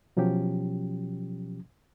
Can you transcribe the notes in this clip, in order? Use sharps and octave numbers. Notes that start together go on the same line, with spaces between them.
B2 F3 F#3 C#4 G4